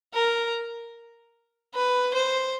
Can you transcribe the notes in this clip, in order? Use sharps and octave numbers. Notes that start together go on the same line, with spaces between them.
A#4
B4
C5